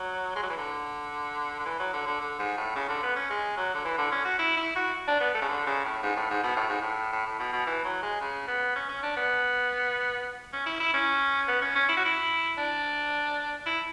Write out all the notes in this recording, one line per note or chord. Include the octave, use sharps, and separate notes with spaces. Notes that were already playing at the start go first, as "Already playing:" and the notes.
Already playing: F#3
G#3
F#3
E3
D3
D3
E3
F#3
D3
D3
D3
G#2
A2
C#3
D3
B3
C#4
G#3
F#3
D3
E3
D3
C#4
F#4
E4
E4
F#4
D4
B3
A3
C#3
D3
C#3
A2
G#2
A2
G#2
B2
A2
G#2
A2
A2
A2
B2
B2
E3
F#3
G#3
C#3
B3
C#4
C#4
D4
B3
C#4
E4
E4
C#4
B3
C#4
C#4
E4
F#4
E4
D4
E4